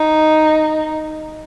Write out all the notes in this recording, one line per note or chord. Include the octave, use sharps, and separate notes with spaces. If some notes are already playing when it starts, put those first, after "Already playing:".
Already playing: D#4